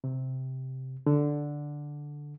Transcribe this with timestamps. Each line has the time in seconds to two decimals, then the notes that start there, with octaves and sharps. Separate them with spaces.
0.04 C3
1.06 D3